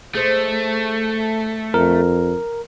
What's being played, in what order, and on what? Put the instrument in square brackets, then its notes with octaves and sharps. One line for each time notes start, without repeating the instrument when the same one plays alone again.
[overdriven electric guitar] A3 [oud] G#4 C5 D#5
[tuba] F2 [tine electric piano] A#4